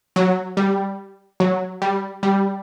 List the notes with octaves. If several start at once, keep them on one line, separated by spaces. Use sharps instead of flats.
F#3
G3
F#3
G3
G3